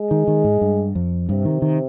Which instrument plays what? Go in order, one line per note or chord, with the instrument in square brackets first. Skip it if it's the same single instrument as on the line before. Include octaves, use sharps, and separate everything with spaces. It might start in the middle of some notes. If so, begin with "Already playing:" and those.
Already playing: [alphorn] G#3
[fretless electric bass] D#3
D#3
G#2
G2
F2
[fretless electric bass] G2 [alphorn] C3
[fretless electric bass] D#3
D#3